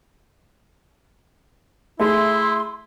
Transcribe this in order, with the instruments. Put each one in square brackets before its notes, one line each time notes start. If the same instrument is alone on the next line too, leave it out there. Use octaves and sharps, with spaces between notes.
[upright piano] A3 G#4 [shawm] E4 [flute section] C6